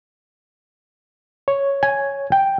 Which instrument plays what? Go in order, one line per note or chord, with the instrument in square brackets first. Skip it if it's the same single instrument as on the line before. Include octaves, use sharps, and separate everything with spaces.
[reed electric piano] C#5
[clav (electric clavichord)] G#5
G5